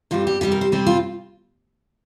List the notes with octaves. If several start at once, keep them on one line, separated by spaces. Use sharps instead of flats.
G2 G3 C4 F4
G4
C3 G3 C4 G4
A#4
C5
C3 G3 C4
F4